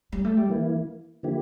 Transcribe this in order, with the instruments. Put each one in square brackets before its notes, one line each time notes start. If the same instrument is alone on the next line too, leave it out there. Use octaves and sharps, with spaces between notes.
[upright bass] G3
A3
G3
[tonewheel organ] E3 A#3 E4
D3 F3 A#3 E4 G4